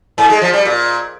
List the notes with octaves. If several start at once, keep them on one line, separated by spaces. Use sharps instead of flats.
G#2
G#3
F3
G3
A#2